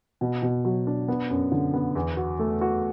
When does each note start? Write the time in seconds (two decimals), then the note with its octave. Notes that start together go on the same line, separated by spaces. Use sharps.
0.21 B2
0.42 B2
0.65 F#3
0.87 D4
1.08 B3
1.30 F#2
1.52 D3
1.74 B3
1.95 E2
2.17 F#4
2.39 A3
2.61 F#4